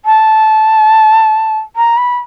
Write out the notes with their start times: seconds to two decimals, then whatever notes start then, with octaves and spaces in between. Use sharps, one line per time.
0.05 A5
1.76 A#5
1.97 B5